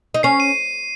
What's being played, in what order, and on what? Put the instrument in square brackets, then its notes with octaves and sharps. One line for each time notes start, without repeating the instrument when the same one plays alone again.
[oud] D#4
[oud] C#4 [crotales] C7
[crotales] D#7